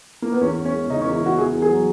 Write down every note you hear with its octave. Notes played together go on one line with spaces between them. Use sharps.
A#3
B3
E2 C#4
E2
C#4
G#3
C#3 D#4
C#4
E2
E4
E2 F#4
E2 G#4
E2
G#4
F#3